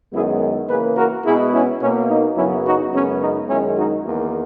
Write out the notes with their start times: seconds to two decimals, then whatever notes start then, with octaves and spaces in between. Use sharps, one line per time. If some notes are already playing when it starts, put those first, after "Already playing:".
0.12 F#2 D#3 G#3 B3 E4 G#4
0.68 C#3 E3 A#3 G#4 B4
0.96 F#4 A#4
1.24 B2 G#3 B3 E4 G#4
1.53 C#4 E4
1.80 B2 A#3 C#4
2.09 D#4
2.36 F#2 C#3 F#3 B3 C#4 E4
2.65 D#4 F#4
2.92 F#2 C#3 G#3 B3 C#4
3.21 D#4
3.48 F#2 D#3 G#3 C#4 E4
3.77 D#4 F#4
4.04 E2 D#3 A#3